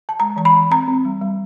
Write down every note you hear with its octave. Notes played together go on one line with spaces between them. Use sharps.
A5
G#3 A#5
E3 A#5
B5
E3
C4 A#5
C4
G3
G3